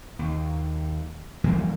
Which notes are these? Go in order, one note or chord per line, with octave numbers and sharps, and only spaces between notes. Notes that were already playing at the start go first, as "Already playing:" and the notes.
D#2
F2 E3 G3 A#3